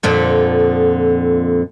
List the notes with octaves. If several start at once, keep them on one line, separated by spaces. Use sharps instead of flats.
F2 A#2 D3